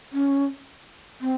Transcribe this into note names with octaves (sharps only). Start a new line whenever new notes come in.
C#4
C4